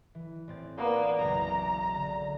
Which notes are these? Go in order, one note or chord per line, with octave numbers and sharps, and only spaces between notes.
E3
A1 C4 A6
A#3 B3 D5 F#5
F#1 B1 A#5
D3